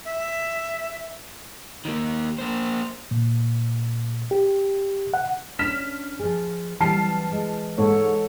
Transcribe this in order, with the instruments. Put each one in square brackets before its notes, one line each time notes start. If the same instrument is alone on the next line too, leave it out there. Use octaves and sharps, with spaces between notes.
[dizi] E5
[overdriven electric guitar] D#3 A#3
A#3 C5
[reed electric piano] A#2
G4
F#5
[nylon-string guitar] C#4 D4 [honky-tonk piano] F6 B6 E7
[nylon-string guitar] F3 G#4
[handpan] E3 [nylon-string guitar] F#3 G3 C4 [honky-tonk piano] A5 F6 C7
[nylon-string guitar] G#3
[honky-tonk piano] G#2 [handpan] A4 C#5